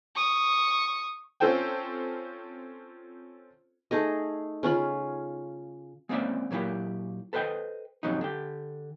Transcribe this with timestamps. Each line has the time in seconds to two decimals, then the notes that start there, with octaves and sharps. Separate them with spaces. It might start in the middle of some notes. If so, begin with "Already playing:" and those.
0.15 C#6 D#6
1.40 C4 C#4 F4 A4 C5 G5
3.91 A3 D#4 G#4 D#5
4.63 C#3 C#4 F4 B5
6.09 G#3 A#3 C4 C#4 D5 E5
6.51 A#2 F#3 A#3 E4 G4
7.33 A4 B4 C5 D#5 G5
8.03 F2 G#2 C3 F#3 C#4 D#4
8.21 D3 G4